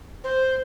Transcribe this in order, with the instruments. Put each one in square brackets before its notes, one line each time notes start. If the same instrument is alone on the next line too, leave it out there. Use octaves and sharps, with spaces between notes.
[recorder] C5